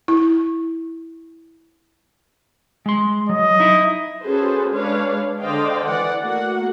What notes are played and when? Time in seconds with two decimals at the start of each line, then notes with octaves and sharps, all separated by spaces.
0.08 E4
2.86 G#3 C6
3.29 F#3 D#5
3.60 D#4 E4 E5
4.25 C#4 F#4 G#4 A4 B4 C5
4.73 G#3 D4 B4 C#5 F5
5.42 D3 C5 D5 D#5 F5 G5
5.85 E3 D5 F#5
6.22 A3 A#3 F#4 F#5